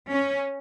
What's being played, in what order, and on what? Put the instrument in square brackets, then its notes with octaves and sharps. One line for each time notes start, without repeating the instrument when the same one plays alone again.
[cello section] C#4